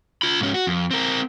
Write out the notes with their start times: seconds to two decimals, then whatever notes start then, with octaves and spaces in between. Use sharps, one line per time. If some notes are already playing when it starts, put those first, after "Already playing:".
0.22 F4 B5
0.41 G#2 C#4
0.54 F#4
0.67 F2
0.91 C4 A#4